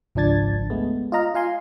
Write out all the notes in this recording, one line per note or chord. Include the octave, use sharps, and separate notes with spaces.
G#1 C#2 F3 D4 G#6 A6
G#3 A3 B3
F4 D#5 A#5 F6
F4 F5 G#5 C6